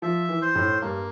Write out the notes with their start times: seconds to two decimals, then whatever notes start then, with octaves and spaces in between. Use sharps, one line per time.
0.02 F3 E5
0.29 E3
0.42 C5
0.55 A2
0.81 G2 A#3